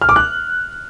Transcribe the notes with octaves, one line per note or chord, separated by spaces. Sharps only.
F6
D6
F#6